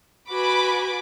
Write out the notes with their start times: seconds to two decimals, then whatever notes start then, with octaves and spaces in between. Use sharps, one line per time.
0.30 F#4 B4 G#5 B5 D6